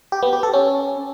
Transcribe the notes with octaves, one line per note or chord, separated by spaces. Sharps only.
G4
B3
G4
A4
C#4